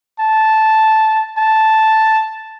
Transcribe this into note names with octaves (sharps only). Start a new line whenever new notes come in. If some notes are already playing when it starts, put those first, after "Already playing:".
A5
A5